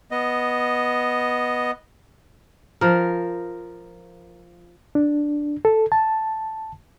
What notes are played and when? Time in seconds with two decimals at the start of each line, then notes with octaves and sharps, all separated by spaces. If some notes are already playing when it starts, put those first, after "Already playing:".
0.11 B3 D#5
2.81 F3 A#4
4.95 D4
5.65 A4
5.92 A5